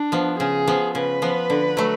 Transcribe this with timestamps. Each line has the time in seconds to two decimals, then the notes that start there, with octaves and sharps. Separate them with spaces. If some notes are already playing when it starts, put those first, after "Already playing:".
Already playing: D4
0.12 F3 B3
0.39 C#3 G#4
0.67 F3 B3
0.94 C#3 B4
1.22 F3 B3
1.50 D3
1.77 F#3 A3